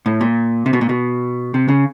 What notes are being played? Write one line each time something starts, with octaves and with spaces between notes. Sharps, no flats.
A2
A#2
C3
B2
A#2
B2
C3
C#3